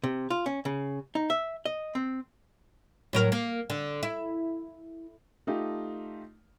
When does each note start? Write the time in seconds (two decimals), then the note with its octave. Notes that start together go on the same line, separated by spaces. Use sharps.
0.04 C3
0.30 F4
0.46 C#4
0.65 C#3
1.15 D#4
1.30 E5
1.65 D#5
1.95 C4
3.13 A2 F#3 A#4
3.32 A#3
3.70 D3
4.03 E4
5.47 A3 D#4 F4 G4